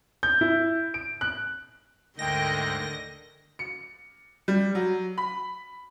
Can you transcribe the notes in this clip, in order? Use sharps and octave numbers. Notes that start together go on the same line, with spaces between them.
G6
E4
D7
F#6
D2 G#2 D3 G#3 A#4 D#5 G5 A#6
C#7
G3
F#3
B5